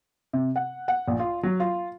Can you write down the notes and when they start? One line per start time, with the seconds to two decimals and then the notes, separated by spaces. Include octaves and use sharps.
0.33 C3
0.56 F#5
0.88 F#5
1.08 A#1
1.19 F4
1.43 F#3
1.60 F4